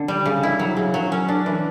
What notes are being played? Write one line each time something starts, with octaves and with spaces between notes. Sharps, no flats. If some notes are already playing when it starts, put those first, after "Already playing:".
Already playing: D3
G3
C#3
E4
F#3
C#3
F#3
C#4
D4
E3